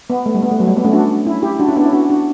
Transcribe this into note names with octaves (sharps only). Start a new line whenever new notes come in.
B3
A3
G3
B3
A3
F#3
G3
B3
A3 C#4
D4 F#4
C#4 E4
E4 G4
D4 F#4
C#4 E4
B3 D4
C#4 E4
D4 F#4
D4 F#4